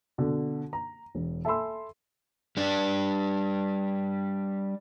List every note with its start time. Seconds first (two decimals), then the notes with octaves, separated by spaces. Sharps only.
0.18 B2 D3
0.73 A#5
1.15 E1
1.45 A4 E5 G#5 B5 C6 E6
2.57 G3 D4